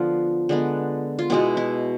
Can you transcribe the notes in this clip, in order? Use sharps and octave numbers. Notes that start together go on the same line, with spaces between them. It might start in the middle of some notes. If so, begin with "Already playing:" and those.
Already playing: D3 F3 B3 F4
D3 G#3 B3
F4
B2 G#3 B3 E4
E4